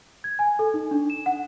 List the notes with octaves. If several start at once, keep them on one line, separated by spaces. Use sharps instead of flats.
G#6
G#5
A4
D#4
D4
E7
F#5